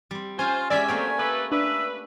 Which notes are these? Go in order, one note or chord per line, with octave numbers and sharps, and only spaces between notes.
G3 C4
C#4 F4 C5 G#5
G#3 C#4 G4 D5 E5 G#5 B6
F#3 A3 A#3 C4 C#5
A3 G4 B4
D4 B4 E5